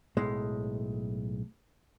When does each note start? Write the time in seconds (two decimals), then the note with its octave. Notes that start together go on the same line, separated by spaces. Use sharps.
0.17 B1 A2 G#3